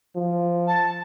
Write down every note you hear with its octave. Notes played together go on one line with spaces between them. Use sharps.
F3
A5